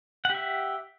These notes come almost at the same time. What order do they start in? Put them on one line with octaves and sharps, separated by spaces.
F#5 G4 E5